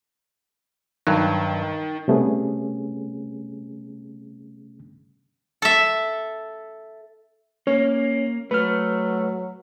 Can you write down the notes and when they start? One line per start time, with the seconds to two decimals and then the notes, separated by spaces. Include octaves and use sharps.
1.07 G2 D#3 F#3
2.08 C3 G3 A3 B3 C#4 G#4
5.62 A4 E5
7.67 A#3 C#4 C#5
8.51 F#3 A3 B4 F6